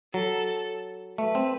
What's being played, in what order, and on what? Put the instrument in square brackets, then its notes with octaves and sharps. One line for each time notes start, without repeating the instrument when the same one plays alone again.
[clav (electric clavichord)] F#3 [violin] A4
[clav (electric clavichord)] A3 [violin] B4
[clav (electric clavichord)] C4